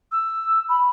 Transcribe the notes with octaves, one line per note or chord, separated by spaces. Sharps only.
E6
B5